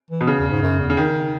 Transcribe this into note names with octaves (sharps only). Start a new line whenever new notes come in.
E3
B2
C#3
E2
G#2
F#2
E2
C#3
D#3